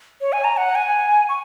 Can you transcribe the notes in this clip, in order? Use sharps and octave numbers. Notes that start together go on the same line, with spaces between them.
C#5
G#5
A#5
F#5
G#5
C#6